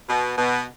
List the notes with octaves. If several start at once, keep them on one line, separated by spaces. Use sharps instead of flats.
B2
B2